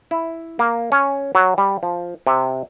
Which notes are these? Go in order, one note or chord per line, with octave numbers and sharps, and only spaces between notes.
E4
A#3
C#4
F#3
G3
F3
C3